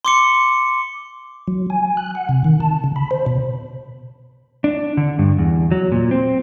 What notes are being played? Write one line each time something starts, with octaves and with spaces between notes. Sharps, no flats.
C6 D6 C#7
F#3
G#5
F#6
F#5
C3
D#3
A5
C#3
B5
C5
B2
D4
D3
G2
E2
F#3
A#2
C4